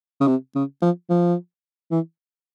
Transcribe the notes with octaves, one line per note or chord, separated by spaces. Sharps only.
C#3
C3
C#3
F3
F3
E3